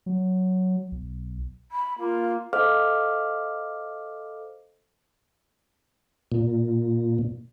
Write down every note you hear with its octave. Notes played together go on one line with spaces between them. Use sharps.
F#3
B1
B5
A#3 F4
A4 C5 D#5 F5 D6 F6
A#2